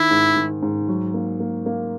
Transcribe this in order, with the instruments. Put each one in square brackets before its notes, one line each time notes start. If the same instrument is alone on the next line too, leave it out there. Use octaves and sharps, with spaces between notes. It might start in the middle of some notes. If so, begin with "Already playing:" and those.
Already playing: [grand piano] D#3 [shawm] E4
[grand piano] G#2
D#3
G#2
F#3
A#3
A#3
A#3